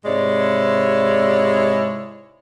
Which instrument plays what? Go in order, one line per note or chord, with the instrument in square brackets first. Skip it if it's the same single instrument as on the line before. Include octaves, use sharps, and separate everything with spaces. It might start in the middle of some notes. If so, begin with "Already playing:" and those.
[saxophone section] G#2 C3 G#3 E4 C#5 D5